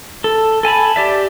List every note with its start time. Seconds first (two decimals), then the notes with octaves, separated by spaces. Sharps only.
0.24 A4
0.63 A4 G#5 A5 B5
0.96 G4 D5 E5